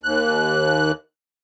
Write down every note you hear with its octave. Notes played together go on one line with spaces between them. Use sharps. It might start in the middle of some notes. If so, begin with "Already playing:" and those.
D#2 F#6